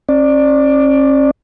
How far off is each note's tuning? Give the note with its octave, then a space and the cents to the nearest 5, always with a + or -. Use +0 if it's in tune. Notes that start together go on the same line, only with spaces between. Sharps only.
C#4 -40 D5 +15